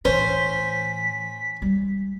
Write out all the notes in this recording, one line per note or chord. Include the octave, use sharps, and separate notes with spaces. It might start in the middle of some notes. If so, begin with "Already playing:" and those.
A2 E3 C#4 C5 B6
G3 G#3